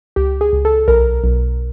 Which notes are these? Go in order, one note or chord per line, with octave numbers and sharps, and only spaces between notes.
C#2 G4
G#4
C#2
A4
B1 A#4
B1